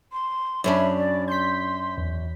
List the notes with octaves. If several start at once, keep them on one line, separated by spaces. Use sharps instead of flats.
C6
F#2 C#4 D4 C#5 E5 B5
D5
C6 G6 B6
G#1 E2